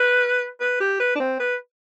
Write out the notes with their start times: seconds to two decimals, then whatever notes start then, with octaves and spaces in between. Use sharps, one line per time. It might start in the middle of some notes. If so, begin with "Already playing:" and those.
Already playing: B4
0.61 B4
0.80 G4
1.00 B4
1.15 D4
1.20 C4
1.40 B4